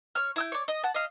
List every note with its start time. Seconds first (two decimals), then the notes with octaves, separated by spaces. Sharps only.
0.15 C#5 F6
0.36 E4 E6 G6
0.52 C#5 D5
0.68 D#5
0.83 F#5 A5
0.94 D#5 F5